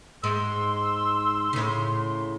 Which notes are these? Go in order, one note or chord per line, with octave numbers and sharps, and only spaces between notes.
G#2 C6 E6
A2 C#3